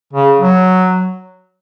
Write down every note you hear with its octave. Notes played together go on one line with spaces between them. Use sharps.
C#3
F#3